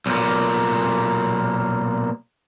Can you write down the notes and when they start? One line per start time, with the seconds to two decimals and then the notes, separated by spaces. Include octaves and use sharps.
0.06 B1 A#2